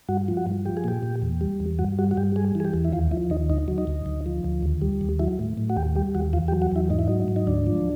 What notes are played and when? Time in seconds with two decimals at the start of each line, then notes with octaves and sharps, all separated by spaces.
0.09 G2 F#4
0.28 F3
0.37 F#4
0.46 G2
0.65 F3 G4
0.77 G#4
0.84 A#2 G4
1.03 A#2
1.22 E2
1.41 G3
1.60 E2
1.79 G2 F#4
1.99 G3 F#4
2.11 F#4
2.17 G2 G4
2.36 G3 G#4
2.55 E3
2.60 G#4
2.65 G4
2.74 E2
2.84 E4
2.93 D#2 F4
3.11 F3 E4
3.30 D#2 D#4
3.50 D2 D#4
3.68 F#3
3.78 D#4
3.87 D2
4.06 D2
4.26 F3
4.44 D2
4.63 D#2
4.82 G3
5.01 D#2
5.19 F#3 E4
5.39 A2
5.57 A2
5.70 F#4
5.76 D#2 G4
5.96 G3 G4
6.15 D#2 F#4
6.33 E2 F4
6.48 G4
6.52 F#3
6.62 F#4
6.72 E2 E4
6.90 G#2 D#4
6.99 E4
7.08 F#3 D#4
7.28 G#2
7.36 D#4
7.47 D2 D4
7.67 F3